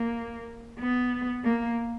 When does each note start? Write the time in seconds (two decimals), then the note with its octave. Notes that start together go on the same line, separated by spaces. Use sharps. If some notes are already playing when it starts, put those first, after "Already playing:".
Already playing: A#3
0.79 B3
1.44 A#3